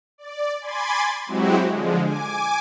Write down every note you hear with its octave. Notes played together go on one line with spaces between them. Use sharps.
D5
G#5 B5 C6 D6 G#6 A6
F#3 G#3 C4 E4 F#4 G4
D3 F3 G#3
G#5 D6